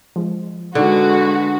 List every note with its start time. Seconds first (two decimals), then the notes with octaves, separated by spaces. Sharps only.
0.16 F3 G#3
0.75 D3 G#3 D#4 F#4 B4 D5